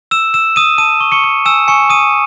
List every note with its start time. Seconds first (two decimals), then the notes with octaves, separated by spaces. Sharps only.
0.11 E6 E7
0.34 E6 E7
0.56 D#6 E6 D#7
0.78 A5 D#6 D#7
1.00 C#6
1.12 C#6 C#7
1.24 C#6
1.45 G#5 E6 E7
1.68 G#5 C#6 C#7
1.90 D#6 E6 D#7